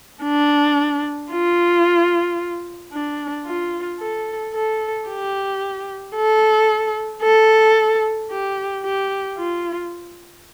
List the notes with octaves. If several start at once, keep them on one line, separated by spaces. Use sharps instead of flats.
D4
F4
D4
F4
A4
A4
G4
A4
A4
G4
G4
F4